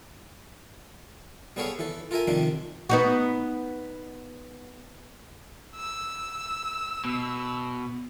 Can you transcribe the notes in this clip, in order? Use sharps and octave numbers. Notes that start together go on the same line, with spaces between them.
G3 B3 G#4 A4 C#5 F5
E3 A4
F4 A4 A#4 E5 G#5
C3 D#3 F3 G3 D4
B3 D#4 F#4
E6
B2